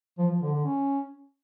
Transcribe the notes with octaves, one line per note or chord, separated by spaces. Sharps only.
F3
F3
D3
D3
C#4